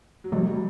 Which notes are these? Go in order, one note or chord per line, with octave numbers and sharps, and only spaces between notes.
F#3
C3 F3 G3 G#3